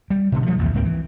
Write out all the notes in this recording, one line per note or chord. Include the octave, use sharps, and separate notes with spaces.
G3
B2 D3 B3
F3 G3 A3
A1 D#2 C3
C#2 G#2 A#3 C4
E3